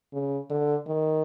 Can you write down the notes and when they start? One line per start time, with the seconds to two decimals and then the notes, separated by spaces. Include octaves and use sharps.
0.13 C#3
0.49 D3
0.86 D#3